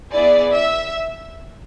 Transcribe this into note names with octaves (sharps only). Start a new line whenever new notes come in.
B3 E4 G#4 D5
E5